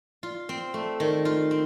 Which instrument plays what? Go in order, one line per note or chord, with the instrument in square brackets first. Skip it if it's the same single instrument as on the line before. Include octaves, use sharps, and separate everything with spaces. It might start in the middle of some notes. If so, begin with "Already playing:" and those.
[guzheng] F4
C4
A3
D#3
F4
C4